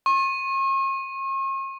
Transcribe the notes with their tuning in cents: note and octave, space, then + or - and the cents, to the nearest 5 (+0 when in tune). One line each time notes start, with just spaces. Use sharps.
C#6 -45